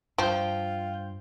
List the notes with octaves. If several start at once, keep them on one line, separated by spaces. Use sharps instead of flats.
G2 F3 F4 G5 G6